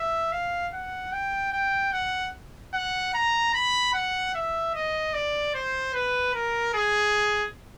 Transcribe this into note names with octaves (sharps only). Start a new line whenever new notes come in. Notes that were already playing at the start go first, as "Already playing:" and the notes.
Already playing: E5
F5
F#5
G5
G5
F#5
F#5
A#5
B5
F#5
E5
D#5
D5
C5
B4
A#4
G#4